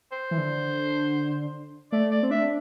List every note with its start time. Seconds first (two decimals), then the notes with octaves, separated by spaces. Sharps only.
0.12 C5
0.31 E3
0.38 D3
1.92 A3 D5
2.11 D5
2.23 C4
2.31 D4 E5